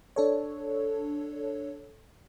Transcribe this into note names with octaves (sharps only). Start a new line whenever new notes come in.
D4 A4 C#5